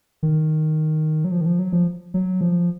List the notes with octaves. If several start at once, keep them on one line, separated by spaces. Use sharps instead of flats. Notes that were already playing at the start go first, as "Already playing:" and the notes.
D#3
F#3
F3
D#3
F3
F#3
F3
F#3
F3